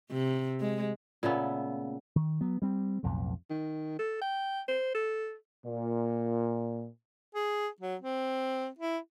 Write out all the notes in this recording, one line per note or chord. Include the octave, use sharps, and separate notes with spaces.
C3
G#3
A#2 C#3 A3 B3
D#3
F#3 B3
G3 C4
B1 F2 A2
D#3
A4
G5
C5
A4
A#2
G#4
F#3
C4
E4